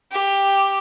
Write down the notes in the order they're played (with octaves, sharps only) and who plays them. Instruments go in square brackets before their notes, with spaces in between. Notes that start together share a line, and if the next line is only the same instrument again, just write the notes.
[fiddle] G4